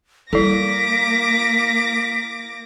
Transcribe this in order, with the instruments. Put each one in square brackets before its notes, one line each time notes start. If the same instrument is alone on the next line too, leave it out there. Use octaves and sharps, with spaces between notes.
[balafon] G3 A4 [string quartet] A#3 D6 A#6 [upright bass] E4 [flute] B6